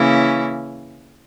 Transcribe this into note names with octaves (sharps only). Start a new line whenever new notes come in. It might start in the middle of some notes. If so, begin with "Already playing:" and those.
Already playing: C#3 E3 A#3 C#4 E4